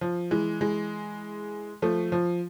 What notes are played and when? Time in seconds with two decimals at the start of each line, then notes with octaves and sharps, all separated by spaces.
0.01 F3
0.31 E3 G#3
0.61 E3 G#3
1.82 F3 A3
2.12 F3